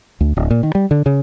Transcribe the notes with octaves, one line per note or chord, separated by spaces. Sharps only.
D2
D1
A#2
D#3
G3
D3
C#3